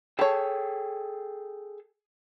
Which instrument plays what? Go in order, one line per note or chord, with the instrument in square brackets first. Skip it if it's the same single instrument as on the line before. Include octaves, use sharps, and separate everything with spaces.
[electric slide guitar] G#4 A4 G5 [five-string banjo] C#5 A5